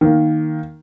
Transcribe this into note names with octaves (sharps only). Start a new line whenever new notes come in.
D#3 A#3